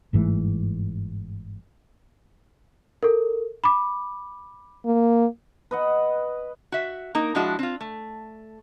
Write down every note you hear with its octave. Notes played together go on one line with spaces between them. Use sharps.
G1 G#2 E3 A3
A4 A#4
B5 D6
A#3
B4 D#5 F#5
F#4 E5
A#3 D#4 A#4
F3 G#3 D4 E4 F#4
C4 F4
A3